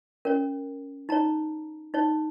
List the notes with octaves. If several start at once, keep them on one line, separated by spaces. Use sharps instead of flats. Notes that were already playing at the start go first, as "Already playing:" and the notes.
C#4 A#4 C#5
D#4 C#5 A#5
D#4 C#5